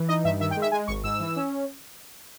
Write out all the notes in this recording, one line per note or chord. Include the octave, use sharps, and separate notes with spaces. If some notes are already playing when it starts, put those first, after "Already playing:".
Already playing: E3
D#4 D#5
G2 E5
D#3 E5
G5
G#3
E5
G#3 G#5
G#1 C#6
G#2 E6
E3
C#4